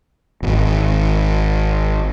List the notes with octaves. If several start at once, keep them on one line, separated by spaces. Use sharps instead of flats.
D1 G#1